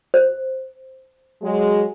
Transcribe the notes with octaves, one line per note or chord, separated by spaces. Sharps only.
C5
F#3 G#3